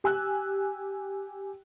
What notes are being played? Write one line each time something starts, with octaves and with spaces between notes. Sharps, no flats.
G4 G#5 E6 F#6